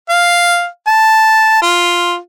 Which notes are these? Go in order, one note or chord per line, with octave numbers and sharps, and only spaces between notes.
F5
A5
F4